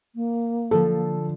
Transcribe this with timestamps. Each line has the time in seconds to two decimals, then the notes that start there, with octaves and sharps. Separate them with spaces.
0.15 A#3
0.71 D3 F3 A4